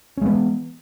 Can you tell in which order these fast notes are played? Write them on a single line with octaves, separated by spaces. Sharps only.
C#4 G#3 B3 E3